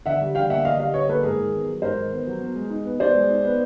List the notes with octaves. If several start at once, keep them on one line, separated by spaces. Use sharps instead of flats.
D3 E5 F#5
G3
D3 F5 G5
A#3 E5 F#5
D3 D#5 F5
G3 D#5 F5
D3 C#5 D#5
A#3 A4 B4
G#2 G#4 A#4
D#3
B3
F#3
G#2 A#4 C5
D#3
B3
F#3
B2
G#3
D#4
B3
B2 C5 D5
G#3
D#4
B3